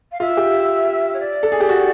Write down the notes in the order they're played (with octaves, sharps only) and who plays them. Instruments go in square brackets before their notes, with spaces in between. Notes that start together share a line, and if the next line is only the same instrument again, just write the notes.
[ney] F5
[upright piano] F4 [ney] E5
[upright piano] G4
[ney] C#5
D5
[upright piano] A4
G#4
G4
F#4